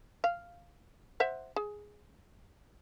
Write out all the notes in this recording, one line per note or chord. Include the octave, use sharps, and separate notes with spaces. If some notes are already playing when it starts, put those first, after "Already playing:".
F5
C5 E5 F#5
G#4